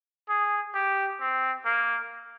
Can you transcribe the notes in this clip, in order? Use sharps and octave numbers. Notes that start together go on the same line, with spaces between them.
G#4
G4
C4
A#3